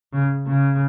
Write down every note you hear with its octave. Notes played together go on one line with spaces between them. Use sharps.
C#3
C#3